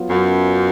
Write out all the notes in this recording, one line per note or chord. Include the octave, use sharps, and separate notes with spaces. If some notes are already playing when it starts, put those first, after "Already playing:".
Already playing: F#3 B3 F4
F#2